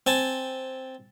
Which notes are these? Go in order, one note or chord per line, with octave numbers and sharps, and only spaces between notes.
C4 G#5 A5